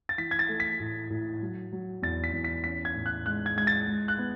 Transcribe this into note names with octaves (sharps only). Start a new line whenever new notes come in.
A6
E3 B6
G#6
A6
A3
B6
A2
A2
F#3
F#3
E2 A6
B6
E2
B6
C#4 B6
G#6
A2
F#6
G#3 F#6
G#6
G#3 G#6
A6
G#3
F#6
B3